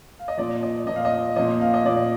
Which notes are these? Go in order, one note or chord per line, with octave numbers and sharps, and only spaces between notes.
F5
D#5
A#2 F3 D5
D#5
A#2 F3 D#5
F5
D#5
A#2 F3 D#5
F5
D#5
A#2 F3 D5